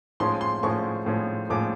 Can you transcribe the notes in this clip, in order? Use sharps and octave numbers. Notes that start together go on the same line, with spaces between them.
A2 F3 G#3 C#4 C6
C6
A2 F3 G#3 C#4 C#6
A2 F3 G#3 C#4
A2 F3 G#3 C#4 D6